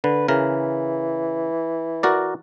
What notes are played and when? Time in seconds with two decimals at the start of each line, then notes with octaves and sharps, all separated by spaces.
0.04 D3 B4
0.28 C#3 E3 A#4
2.03 F#4 A#4 D5